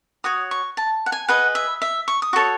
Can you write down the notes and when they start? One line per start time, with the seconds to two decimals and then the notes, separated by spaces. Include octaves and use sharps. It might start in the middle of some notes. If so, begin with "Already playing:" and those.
0.24 F#4 C#5 D#6
0.51 C#6
0.77 A5
1.06 F#5
1.12 G#5
1.28 G#4 B4 D#5 F#5
1.55 E5
1.82 E5
2.08 C#6
2.22 D#6
2.33 F#4 A4 C#5 C#6